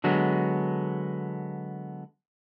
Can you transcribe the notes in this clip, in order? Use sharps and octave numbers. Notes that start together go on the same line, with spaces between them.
D3 F#3 G#3 B3